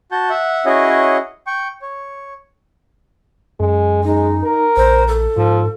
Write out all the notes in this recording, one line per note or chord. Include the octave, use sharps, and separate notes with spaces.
F#4 A5 G6
E5 F#5
C#4 E4 F#4 G#4 C#5 D#5
G5 C#6
C#5
F#2 G#3
G#3 D#4
A#4
A#1 C5
A4
G#2 F3